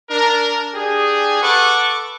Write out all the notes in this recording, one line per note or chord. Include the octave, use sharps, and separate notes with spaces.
D4 A#4
D4 G4 G#4
A4 B4 F#5 C#6 D6